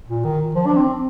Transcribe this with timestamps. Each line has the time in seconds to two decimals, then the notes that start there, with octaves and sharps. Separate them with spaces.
0.08 A#2
0.25 D#3
0.55 F3
0.66 D4
0.77 C4